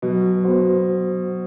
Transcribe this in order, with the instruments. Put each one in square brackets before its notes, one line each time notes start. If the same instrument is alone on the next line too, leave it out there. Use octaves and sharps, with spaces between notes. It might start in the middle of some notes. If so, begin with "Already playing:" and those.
[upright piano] B2 [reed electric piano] F#3
[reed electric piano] B3 F#4 C5